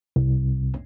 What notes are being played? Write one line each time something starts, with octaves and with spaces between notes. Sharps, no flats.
C2